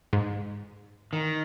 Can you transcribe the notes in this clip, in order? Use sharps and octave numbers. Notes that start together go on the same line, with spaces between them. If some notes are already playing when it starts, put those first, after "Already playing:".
G#2
D#3